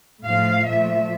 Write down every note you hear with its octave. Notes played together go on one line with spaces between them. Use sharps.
A2 F3 A3 F5
A#2 F3 A3 E5